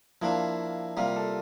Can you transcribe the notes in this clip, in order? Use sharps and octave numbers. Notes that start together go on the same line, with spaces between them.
F3 A#3 D4 E4
C3 G3 A#3 F4
A4